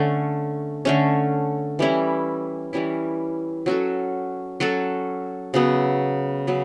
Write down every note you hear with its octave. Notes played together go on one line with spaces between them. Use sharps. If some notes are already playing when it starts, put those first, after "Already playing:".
Already playing: D3 A3 C#4
D3 A3 C#4
E3 G3 C#4 E4
E3 G3 C#4 E4
F#3 C#4 F#4 A4
F#3 C#4 F#4 A4
C#3 F#3 B3
C#3 F#3 B3